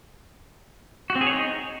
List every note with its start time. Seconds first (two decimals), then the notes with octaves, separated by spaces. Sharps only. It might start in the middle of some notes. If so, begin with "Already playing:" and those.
1.10 F#4
1.15 C4
1.21 G#4
1.27 C#5
1.32 D#4